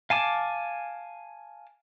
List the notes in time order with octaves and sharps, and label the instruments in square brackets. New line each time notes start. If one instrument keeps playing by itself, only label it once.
[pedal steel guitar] F5 G#5 A5 D6